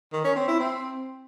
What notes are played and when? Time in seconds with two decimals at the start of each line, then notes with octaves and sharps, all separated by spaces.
0.13 D#3
0.24 C#4
0.36 C4
0.48 E4
0.60 C4